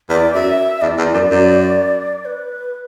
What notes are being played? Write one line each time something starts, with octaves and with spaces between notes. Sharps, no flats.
E2 D5
F#2 E5
E2 D5
E2
F#2
F#2
B4